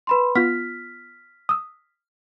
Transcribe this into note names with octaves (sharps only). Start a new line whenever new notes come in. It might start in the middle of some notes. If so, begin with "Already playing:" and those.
B4 B5 C6
B3 F4 F6 B6
D#6 E6